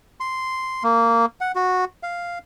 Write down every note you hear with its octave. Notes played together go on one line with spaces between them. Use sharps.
C6
A#3
F#5
F#4
F5